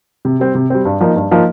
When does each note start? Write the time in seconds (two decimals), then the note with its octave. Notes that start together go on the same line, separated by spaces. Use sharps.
0.25 C3
0.40 G3 C4
0.55 C3
0.70 G3 C4
0.85 G2
1.01 F3 A#3 D#4
1.16 G2
1.31 F3 A#3 D#4